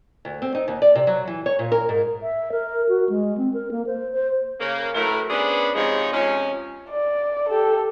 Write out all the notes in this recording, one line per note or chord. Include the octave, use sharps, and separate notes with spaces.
D2
C4
D#4
D#2
D5
C3
F#3
E3
C#5
A#2
A#4
G#2
E5
A#4
F#4
G#3
C4
A#4
A#3
C5
C5
C#3 A#3
A2 F#3 A3 A#4 B4 A#5
B3 C#4 D4 G#4 B4 C5
G#2 C3 F3 G#3 D#4 C#5
C3 F3 G#3 C#4
D5
G4 A4